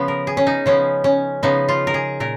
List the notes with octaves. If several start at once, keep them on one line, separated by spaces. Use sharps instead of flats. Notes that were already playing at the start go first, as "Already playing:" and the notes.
Already playing: C#3 F3 B3
A#4
G#4
C#4
D#4
C#3 F3 B3 C#4
C#4
C#3 F3 B3 D#4
F4
A#4
G#4
A#2 A#4